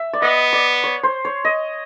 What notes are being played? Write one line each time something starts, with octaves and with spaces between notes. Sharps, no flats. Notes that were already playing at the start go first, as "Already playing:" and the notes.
Already playing: E5
D5
B3 D#5
D5
C#5
C5
C#5
D#5